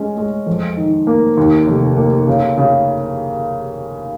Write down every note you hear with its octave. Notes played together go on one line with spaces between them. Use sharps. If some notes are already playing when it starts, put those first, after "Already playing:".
Already playing: G#3 C#4
G#3
F2
D#3
A#3
D#2
F1
A#3
C#3
C#3